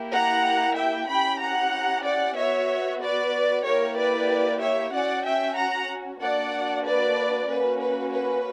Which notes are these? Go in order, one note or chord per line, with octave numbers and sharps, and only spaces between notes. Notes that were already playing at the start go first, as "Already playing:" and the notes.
Already playing: A#3 E4 G4
F#5 A#5
E5 G5
C#4 E4 G4 G5 B5
F#5 A#5
D5 F#5
B3 F#4 C#5 E5
B4 D5
A#3 E4 G4 A#4 C#5
B4 D5
C#5 E5
C#4 F#4 D5 F#5
E5 G5
F#5 A#5
A#3 D4 F#4 D5 F#5
B4 D5
A#3 C#4 F#4 B4
B4
B4